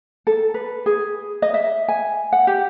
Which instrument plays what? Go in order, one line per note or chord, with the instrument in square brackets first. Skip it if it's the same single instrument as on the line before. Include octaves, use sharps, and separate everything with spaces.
[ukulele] A4
B4
G#4
D#5
E5
G#5
F#5
G4